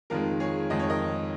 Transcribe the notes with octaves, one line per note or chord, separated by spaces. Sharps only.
F2 D#3 G#3 F4 A#4
G#4 C#5
F2 D#3 G#3 D#5
C#5
A#4 D#5